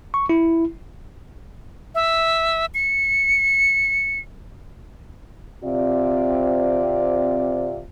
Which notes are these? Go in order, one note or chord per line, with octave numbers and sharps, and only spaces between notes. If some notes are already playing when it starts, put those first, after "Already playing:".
C#6
E4
E5
C#7
C3 C4 F4 D5